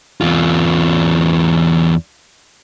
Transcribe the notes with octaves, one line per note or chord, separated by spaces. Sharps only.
E2 F4